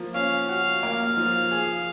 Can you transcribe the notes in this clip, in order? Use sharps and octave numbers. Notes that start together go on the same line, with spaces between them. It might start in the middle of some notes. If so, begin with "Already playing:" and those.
Already playing: F3 A#3
C#4 F5
F#4
A#3
F3
G#4